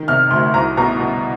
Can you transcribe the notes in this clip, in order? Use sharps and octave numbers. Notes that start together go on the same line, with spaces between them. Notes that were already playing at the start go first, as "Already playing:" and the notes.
Already playing: D#3
C3 F6
D2 C6
C2 A#5
B2 A#5
B2